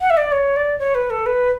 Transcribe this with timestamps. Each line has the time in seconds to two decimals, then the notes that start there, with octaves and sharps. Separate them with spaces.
0.01 F#5
0.10 E5
0.17 D5
0.32 C#5
0.56 D5
0.79 C#5
0.95 B4
1.10 A4
1.26 B4